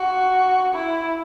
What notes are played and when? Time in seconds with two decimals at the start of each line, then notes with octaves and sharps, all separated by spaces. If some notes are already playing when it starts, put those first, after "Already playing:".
Already playing: F#4
0.74 E4